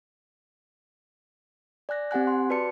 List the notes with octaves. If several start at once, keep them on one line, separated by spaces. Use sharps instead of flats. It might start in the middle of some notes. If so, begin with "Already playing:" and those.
D5 G#5 F#6 A#6
C4 G4 F#5 G#5 F#6
C6
F#4 B4 D5 A5 F#6 C#7